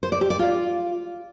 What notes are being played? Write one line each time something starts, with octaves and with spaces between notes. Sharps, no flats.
C5
D5
G4
D5
F4